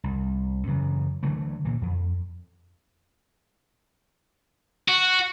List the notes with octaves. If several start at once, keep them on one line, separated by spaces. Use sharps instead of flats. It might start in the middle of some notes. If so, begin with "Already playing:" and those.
C2
F#2 C#3 E3
D3 E3 F#3 A3
A#2 E3
F2
F#4